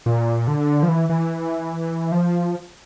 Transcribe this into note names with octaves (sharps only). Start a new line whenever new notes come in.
A#2
D3
F3
E3
E3
F3